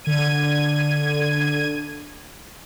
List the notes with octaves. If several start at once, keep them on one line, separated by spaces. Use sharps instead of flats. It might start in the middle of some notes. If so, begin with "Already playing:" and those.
D3 G#6 D#7